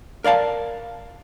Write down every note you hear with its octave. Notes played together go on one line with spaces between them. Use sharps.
A#4 D5 F5 A5